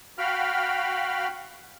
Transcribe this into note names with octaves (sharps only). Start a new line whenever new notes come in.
F#4 F5 G5 B5 F6